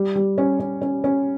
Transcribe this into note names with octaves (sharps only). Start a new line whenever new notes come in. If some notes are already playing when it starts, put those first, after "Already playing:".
Already playing: G3
G3
C#4
C#4
C#4
C#4